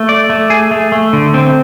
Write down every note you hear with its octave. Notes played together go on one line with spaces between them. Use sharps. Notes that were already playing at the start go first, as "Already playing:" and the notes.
Already playing: A3
D5
A3
G#4
A3
A3
D3
C4